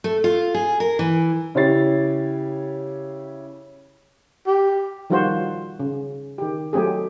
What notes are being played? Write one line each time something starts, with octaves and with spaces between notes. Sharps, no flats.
A3
F4
G#4
A#4
E3
C#3 E4 G4 C#5 A6 C7
G4
D#3 F3 G3 F4 F#4 C5
C#3
D#3 G4
F#3 A3 C4 G4 G#4